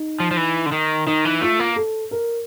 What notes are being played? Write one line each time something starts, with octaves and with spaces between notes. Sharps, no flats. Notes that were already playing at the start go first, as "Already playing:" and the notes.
Already playing: D#4
F3
F3
E3
D3
D#3
D#3 D#4
E3
A3 F4
A#3
A4
A#4